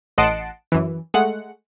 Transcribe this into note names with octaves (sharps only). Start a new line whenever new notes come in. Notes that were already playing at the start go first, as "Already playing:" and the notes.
A1 D#5 F#5 A5 C6 D7
F#2 E3
G#3 A3 F#5